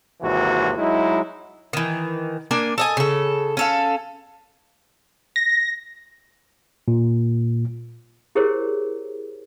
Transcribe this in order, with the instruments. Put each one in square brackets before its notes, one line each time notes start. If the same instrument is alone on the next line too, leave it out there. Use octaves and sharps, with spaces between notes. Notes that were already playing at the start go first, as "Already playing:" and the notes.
[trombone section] G#1 D#2 C3 E3 F#4
F#3 G#3 D#4 E4
[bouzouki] D#3 E3
A#3 D4 G#5
A4 D#5 G#5
C#3 A4
C#4 A4 F5
[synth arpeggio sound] A#6
[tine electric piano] A#2
[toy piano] E4 G4 G#4 A#4 C5 C#5